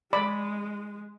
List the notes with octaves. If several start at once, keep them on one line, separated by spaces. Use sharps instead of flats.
G#3 D5 B5